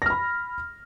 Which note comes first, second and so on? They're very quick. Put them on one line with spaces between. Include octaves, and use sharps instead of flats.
A#6 F6 B5